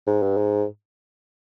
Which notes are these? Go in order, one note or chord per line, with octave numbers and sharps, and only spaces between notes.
G#2
G2
G#2